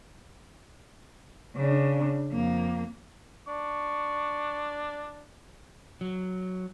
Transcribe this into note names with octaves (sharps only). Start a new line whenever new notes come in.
C#3 D4
F2 A#3
D4 C#6
F#3